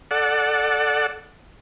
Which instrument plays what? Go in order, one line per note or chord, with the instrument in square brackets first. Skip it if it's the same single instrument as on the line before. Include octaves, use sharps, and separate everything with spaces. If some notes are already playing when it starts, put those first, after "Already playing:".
[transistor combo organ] A4 D5 F#5